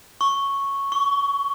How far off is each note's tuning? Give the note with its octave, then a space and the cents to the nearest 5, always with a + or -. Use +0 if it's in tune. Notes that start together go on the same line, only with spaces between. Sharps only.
C#6 -5
C#6 +25